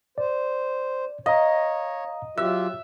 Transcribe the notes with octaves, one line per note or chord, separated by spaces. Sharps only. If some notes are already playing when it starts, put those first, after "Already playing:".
C5 D5
C#5 D#5 F5 A#5
F#3 F4 G4 E5 F#6